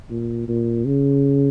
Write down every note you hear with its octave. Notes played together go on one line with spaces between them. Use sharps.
A#2
A#2
C#3